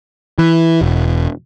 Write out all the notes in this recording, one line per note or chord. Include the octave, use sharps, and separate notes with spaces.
E3
E1